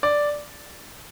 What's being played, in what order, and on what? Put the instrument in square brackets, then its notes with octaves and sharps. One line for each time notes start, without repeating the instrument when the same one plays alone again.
[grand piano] D5